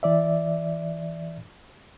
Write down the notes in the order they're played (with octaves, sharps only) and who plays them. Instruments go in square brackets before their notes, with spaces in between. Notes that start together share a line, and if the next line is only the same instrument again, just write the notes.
[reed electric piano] E3 D5 E5